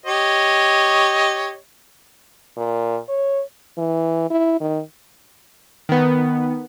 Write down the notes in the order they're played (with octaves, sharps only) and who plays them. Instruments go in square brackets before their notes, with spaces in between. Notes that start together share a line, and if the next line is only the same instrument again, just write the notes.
[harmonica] G4 C#5 D#5
[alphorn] A#2
C#5
[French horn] E3
E4
D#3
[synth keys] D#3 B3